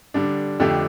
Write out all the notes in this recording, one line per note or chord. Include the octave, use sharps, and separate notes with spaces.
D3 G3 D4
F2 D3 A3 D4 G4